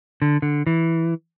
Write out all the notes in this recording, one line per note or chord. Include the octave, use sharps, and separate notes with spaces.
D3
D3
E3